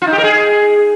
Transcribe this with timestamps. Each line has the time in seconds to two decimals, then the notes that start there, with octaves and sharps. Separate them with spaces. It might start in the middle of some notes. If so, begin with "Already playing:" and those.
0.02 F4
0.07 D#4
0.13 G4
0.18 A#4
0.24 G#4